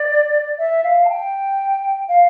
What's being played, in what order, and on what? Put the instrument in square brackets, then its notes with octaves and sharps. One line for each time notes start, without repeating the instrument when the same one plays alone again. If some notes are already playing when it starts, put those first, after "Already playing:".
Already playing: [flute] D5
E5
F5
A5
G5
F5